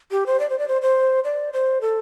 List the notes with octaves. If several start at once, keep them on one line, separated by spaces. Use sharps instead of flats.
G4
C5
D5
C5
D5
C5
C5
D5
C5
A4